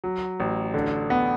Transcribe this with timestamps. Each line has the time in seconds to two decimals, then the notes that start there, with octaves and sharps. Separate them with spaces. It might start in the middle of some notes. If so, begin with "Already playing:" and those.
0.04 F#3
0.40 A1
0.74 D3
1.10 B3